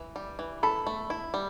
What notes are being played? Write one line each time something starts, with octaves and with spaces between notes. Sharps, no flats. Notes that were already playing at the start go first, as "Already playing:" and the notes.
Already playing: E3
G3
E3
A4 B5
A3
E4
G3